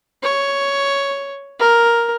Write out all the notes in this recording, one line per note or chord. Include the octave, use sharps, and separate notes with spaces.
C#5
A#4